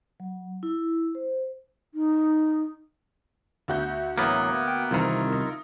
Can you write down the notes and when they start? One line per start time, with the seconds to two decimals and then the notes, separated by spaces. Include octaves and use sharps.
0.20 F#3
0.63 E4
1.15 C5
1.94 D#4
3.68 D2 F#4 G6
4.18 A2 E3 F#3 A#3 B3
4.67 G5
4.91 C2 D#3 E3 C4 E4 F4 A#4 A#5
5.32 D#4